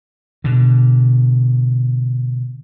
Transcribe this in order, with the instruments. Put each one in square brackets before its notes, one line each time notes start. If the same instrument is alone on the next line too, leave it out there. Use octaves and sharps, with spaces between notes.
[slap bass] B2 D3